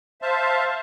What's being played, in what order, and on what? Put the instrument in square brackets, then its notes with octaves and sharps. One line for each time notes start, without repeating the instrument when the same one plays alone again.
[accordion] C5 E5 F5 A5